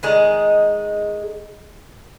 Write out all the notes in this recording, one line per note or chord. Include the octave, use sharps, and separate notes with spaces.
D#3 G#3 D#4 G#4